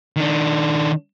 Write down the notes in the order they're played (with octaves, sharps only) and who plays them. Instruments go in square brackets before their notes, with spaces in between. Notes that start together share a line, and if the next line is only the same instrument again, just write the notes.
[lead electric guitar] D#3 D4